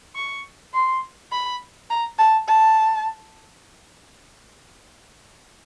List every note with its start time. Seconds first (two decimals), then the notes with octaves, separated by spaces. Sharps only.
0.15 C#6
0.74 C6
1.32 B5
1.90 A#5
2.18 A5
2.48 A5